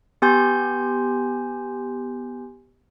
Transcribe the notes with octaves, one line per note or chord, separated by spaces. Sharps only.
B3 G4 G#5 C6 G6